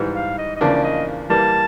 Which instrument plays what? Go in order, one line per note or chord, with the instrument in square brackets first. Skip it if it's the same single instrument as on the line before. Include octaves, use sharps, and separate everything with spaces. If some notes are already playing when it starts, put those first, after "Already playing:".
Already playing: [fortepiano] G#2 E3 G3
[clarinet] F5
D#5
D#5
[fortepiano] E2 C#3 F3 A#3 D4 [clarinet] D5
[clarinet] D#5
[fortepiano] E3 G3 A#3 [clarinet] A5